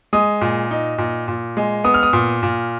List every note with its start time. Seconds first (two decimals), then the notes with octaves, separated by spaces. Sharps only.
0.13 G#3 D#6
0.41 A#2
0.71 D#4
0.98 A#2
1.28 A#2
1.57 G#3
1.84 B3 D#6
1.94 F6
2.03 D#6
2.13 A#2
2.43 A#2